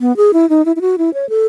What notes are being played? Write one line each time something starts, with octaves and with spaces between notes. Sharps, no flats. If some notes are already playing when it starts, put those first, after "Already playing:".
B3
G#4
E4
D#4
E4
E4
F#4
E4
C#5
A4